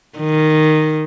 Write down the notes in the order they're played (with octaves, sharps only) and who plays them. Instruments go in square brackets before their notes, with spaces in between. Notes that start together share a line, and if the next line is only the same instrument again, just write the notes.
[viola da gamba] D#3